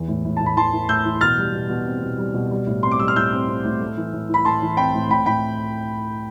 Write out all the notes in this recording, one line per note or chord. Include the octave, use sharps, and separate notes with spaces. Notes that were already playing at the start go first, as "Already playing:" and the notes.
Already playing: E2 E3
A2
A2
A2 A5
B5
E3 A5 C6
E3
A2 E6 G6
E3
B2 F6 A6
G3
B2
B2
C4
B2
G3
B2
G3
A2
C4 C6
D6
G3 E6
F6
A2 E6 G6
C4
C4
A2
A3
E3
A2
E3 B5
A2 A5 C6
E3
C4 G5 B5
A2
A2 G5 B5
A2 G5 B5